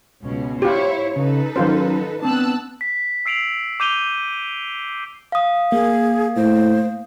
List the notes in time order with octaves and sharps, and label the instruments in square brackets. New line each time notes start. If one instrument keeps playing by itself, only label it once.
[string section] C#2 B2 C#4
[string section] E4 C5 C#5 [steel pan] F4 G4
[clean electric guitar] C#3 [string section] D#4 A4 B4
[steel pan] D#3 F4 C5 [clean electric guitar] F#3 C#4
[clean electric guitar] B3 C4 D4 [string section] A5 E6 F#6
[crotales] B6
E6 C7 D7 F7 F#7
D6 G6 D#7 F7 G7
[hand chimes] F5 D#6
[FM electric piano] A#3 [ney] G#4
[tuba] A2 [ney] C5